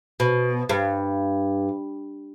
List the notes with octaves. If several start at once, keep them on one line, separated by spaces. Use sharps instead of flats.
B2
G2